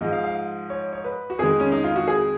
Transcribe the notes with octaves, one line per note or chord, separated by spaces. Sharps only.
G#2 F3 G#3 D#5
F5
F5
C#5
C#5
B4
F#4
F2 D#3 G#3 G#4
C#4
D#4
F4
F#4
G#4